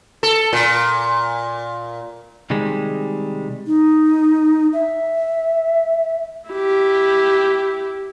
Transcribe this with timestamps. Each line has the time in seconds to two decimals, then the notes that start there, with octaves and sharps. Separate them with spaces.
0.23 A4
0.53 A#2
2.50 C3 D#3 G3 G#3
3.67 D#4
4.73 E5
6.50 E4 G4